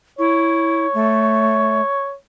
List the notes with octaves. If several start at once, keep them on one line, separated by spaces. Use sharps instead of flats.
E4 C#5
A3